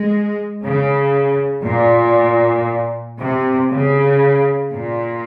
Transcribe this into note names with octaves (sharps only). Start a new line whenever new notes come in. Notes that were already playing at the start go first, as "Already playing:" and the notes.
Already playing: G#3
C#3
A#2
C3
C#3
A#2